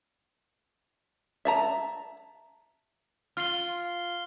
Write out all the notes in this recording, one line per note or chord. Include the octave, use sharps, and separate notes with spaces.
E5 A5 A#5
F4 F6 C7 G7